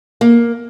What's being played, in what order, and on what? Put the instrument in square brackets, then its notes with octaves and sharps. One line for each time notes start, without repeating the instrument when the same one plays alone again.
[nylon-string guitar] A#3